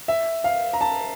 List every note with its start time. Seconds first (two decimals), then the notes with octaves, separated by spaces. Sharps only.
0.08 E5
0.44 F5
0.73 A#5
0.81 A5